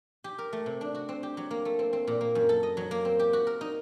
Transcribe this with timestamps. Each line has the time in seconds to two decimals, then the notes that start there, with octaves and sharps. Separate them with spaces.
0.24 G4
0.38 A#4
0.53 A3
0.66 C3
0.81 D4
0.95 F#4
1.09 C4
1.23 G4
1.37 F#3
1.51 A#3
1.65 A3
1.79 C4
1.93 C4
2.07 A#2
2.21 A#3
2.35 F#2
2.49 A4
2.63 D#5
2.77 F#3
2.91 A#3
3.05 C4
3.19 G4
3.33 F#4
3.47 A#4
3.61 D#4